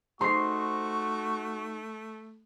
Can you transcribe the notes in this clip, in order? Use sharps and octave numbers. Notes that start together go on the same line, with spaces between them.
A3 D#4 F#4 G#4 C5 C6 C#6 C7